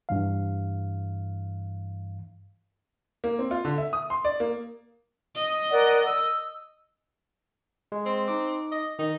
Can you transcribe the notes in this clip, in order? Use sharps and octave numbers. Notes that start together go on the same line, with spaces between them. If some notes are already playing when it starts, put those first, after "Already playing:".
G2 E3 F5
A#3
C4
F4
D3
E5
D#6
C6
D5
A#3
D#5
A#4 D5 F#5
E6
G#3
C4
D#4 D6
D#5
D#3 D#4